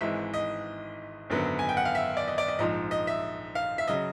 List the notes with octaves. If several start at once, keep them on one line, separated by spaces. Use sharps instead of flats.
G#1 G#2 E3 G#3 E5
D#5
G#1 F#2 D3 F#3 B3
G#5
G5
F#5
F5
E5
D5
D#5
D5
D#5
A#1 G#2 F3 D#5
D#5
E5
F5
E5
C#3 F#3 D#5